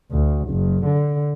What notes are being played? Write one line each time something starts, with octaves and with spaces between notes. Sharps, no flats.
D2
F#1
D3